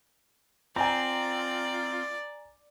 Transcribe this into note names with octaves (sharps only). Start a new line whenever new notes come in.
C4 F4 D5 G#5 A#5